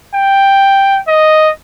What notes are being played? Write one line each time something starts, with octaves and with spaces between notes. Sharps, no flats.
G5
D#5